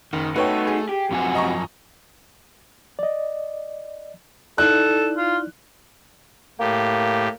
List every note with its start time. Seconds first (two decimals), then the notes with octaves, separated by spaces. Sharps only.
0.13 F#1 D#3
0.36 A3 D#4 F#4 B4 C#5 G5
0.67 G#4
0.89 G4
1.11 F#2 C3 F3 F#4 G#5
1.35 D#5 A#5 C#6
2.99 D5 D#5
4.58 D#4 E4 A4 D5 F#6
5.17 F4
6.60 A2 A#3 G4